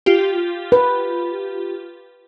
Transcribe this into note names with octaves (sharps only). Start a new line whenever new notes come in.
F4 G4
B4